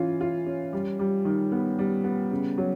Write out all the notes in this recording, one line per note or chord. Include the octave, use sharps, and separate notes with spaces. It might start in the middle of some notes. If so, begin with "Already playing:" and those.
Already playing: E3 C#4 F4
F4
C#4
G3
G3
D#3
B3
G3
B3
C#3
F#3